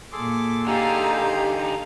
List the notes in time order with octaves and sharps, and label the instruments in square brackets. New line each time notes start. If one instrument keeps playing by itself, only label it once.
[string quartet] A#2 D6 [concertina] G#4 A4 C6
[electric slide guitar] D3 D#4 [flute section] G4 G#5 [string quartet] F5 A#5